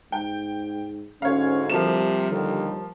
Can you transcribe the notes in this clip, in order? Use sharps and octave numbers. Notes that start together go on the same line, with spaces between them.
G#2 G5
D2 G#2 C#4 C#5 F5
C3 F3 G3 A#3 E7
D#2 D3